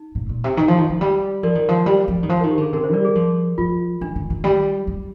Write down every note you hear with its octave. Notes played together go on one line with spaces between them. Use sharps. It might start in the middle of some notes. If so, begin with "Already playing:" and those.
Already playing: D#4
A#2
A#2
C3
D#3
F3
D#3
F3
G3
F3 A#4 D5
D#3
F3
G3
F3
D#3
F3 C5
D#3 A#4
G4
D3 G#4
C3 A#4
C5
G3 A#4 D5
G#4
F3
F3 F4
D#3 D4
D3
D#3
G3
G3